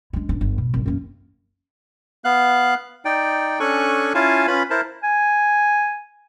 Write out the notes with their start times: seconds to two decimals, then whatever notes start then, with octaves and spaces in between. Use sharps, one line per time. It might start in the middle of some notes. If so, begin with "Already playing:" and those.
0.13 G#3 D4
0.29 G#1 D4
0.41 G1
0.58 B2
0.74 G#1
0.86 F#2 A#3
2.24 B3 F5 F#6
3.05 D#4 D5 G5
3.60 C#4 D4 A4 G#5 C#6 F#6
4.14 C#4 E4 F4 F5 G#5 A5
4.47 C#4 F4 B4 B5
4.70 E4 A#4 C5 A5
5.03 G#5